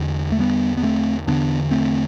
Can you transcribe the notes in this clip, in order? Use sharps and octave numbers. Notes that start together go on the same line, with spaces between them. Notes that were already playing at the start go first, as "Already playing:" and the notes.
Already playing: E2 D3
A3
G3 B3
B3
A3 C4
E2 D3 B3 D4
A3 C4